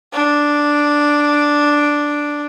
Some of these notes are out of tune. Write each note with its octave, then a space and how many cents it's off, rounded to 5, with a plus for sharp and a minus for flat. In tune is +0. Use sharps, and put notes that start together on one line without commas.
D4 +0